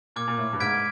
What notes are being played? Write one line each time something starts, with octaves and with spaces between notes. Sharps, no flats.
A#2 D6 F6 G#6
A#2
A2
G2
G#2 F6 G#6 B6 D7